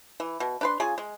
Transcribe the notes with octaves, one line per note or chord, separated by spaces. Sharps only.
E3
B2
D4 B4 C6
C#3 F4 G#4 G#5
G#3